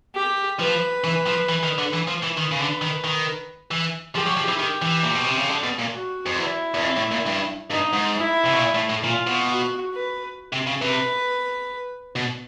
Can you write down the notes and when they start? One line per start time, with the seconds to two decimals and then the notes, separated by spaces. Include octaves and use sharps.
0.15 G4
0.60 F3 B4
1.04 E3
1.26 F3
1.49 E3
1.63 D#3
1.78 D3
1.93 E3
2.07 F3
2.23 E3
2.37 D#3 B4
2.51 C#3
2.60 D3
2.82 D#3
3.04 D#3
3.71 E3
4.15 F3 G4
4.27 F#3
4.37 F3
4.49 E3
4.59 D#3 G4
4.82 E3
5.03 A#2
5.15 B2
5.26 C3
5.37 C#3
5.49 D3
5.63 B2
5.79 A#2
5.93 F#4
6.26 F2
6.37 E2 E4
6.74 E2
6.82 F2
6.97 A2
7.12 A#2
7.26 G2
7.71 G2 D#4
7.93 G#2
8.16 E4
8.46 C3
8.53 B2
8.60 A#2
8.75 A2
8.90 A2
9.04 A#2 F4
9.27 B2
9.49 F#4
9.93 B4
10.53 C3
10.67 C#3
10.82 C3 B4
12.16 B2